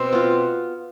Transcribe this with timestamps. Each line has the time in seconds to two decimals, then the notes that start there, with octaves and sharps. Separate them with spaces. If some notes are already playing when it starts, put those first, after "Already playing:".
Already playing: B2 C4
0.13 B3 F4